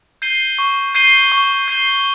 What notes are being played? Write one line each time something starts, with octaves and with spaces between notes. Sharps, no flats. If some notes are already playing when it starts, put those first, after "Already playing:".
G6 C7 D#7 G7
C#6
G6 C7 D#7 G7
C#6
G6 C7 D#7 G7